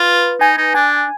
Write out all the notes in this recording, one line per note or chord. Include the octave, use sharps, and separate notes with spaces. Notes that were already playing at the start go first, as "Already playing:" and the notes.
Already playing: F4 B4
D#4 G#5
D#4
D4 G#5